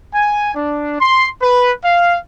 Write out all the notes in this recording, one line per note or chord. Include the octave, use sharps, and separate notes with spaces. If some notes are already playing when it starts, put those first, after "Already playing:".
G#5
D4
C6
B4
F5